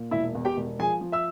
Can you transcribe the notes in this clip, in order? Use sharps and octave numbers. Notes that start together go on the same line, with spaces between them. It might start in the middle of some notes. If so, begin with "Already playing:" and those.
Already playing: A#2
E1 E4 E5
E2
G4 G5
E1
F3 G#4 G#5
F3
E5 E6